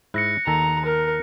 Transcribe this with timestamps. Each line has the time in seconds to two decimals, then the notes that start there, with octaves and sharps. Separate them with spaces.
0.14 G#2 E4 F#6 A#6 C#7
0.47 D#2 D#3 A4 A#5
0.85 A#4